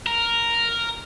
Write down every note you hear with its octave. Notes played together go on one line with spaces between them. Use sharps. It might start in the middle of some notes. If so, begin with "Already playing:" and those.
A#4